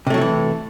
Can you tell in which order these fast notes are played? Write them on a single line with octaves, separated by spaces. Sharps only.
C3 A3 F#3 E4 E3